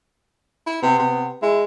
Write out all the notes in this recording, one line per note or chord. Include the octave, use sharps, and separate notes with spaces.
E4
C3 B3
C3
G#3 E4